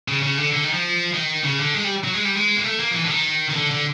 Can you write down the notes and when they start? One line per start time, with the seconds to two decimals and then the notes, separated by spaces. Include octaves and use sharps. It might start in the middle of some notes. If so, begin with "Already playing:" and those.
0.08 C#3
0.23 C#3
0.38 D3
0.53 D3
0.64 D#3
0.73 F3
1.14 D#3
1.44 C#3
1.59 D3
1.74 G#3
1.84 G3
2.04 F#3
2.14 G#3
2.25 G3
2.35 G#3
2.56 A#3
2.65 A3
2.80 A#3
2.91 F3
2.95 E3
3.05 D3
3.10 D#3
3.50 D#3
3.56 D3
3.71 D3